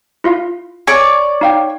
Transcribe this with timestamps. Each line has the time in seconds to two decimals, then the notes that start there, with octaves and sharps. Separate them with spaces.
0.24 E4 F4 F5
0.87 C#5 D5 G#5
1.41 D#4 F5 G5